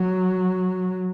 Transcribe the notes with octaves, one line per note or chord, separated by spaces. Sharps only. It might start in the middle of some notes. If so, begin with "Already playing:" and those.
Already playing: F#3